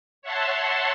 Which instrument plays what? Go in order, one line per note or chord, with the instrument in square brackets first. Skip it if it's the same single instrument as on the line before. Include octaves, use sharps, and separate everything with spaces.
[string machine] C#5 E5 F#5 A5 C6